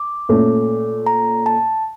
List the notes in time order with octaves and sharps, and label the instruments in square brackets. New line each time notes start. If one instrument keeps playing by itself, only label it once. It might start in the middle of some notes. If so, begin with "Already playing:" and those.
Already playing: [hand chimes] D6
[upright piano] A#2 A3 C#4
[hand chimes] A#5
A5